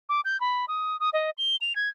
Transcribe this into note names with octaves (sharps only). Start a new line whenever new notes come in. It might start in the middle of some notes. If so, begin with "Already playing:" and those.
D6
G6
B5
D#6
D#6
D#5
G7
F7
G#6